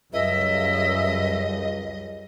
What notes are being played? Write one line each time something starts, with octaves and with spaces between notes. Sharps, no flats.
C#2 F#2 G3 D#5 E5